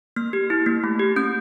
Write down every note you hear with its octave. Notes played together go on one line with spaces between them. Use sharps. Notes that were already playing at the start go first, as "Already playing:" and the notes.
A#3 F6
G4
E4
A#3
A3
G4
C#4 G6